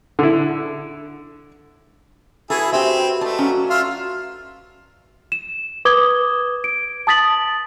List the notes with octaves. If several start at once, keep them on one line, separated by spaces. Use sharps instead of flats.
D3 E4
D4 E4 F#4 G#4 A4 B4
C4 G4 E5
A3 D5 D#5 A5
F#3 C#4 F5 F#5
F4 E5 F6
E7
B4 D6 D#6 G#6 G7
D7
A5 D#6 A6 B6 F#7